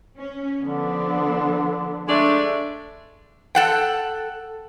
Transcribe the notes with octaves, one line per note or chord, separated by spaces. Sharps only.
C#4
D3 F3 B3 D4
G#3 A3 D4
A4 F#5 G5